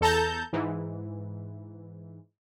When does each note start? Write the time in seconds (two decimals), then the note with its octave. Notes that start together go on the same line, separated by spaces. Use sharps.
0.01 E2 A4 A5 A#5 G6
0.53 G#2 E3